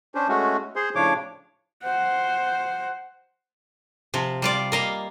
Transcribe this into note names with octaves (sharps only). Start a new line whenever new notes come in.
C#4 D4 C5
G#3 A3 C#4 F#4
G#4 C5 C6
A2 C#3 F3 D4 C#5 D6
C5 F#5
C3 F3
G3 F4 D5
A#3 D#5 F5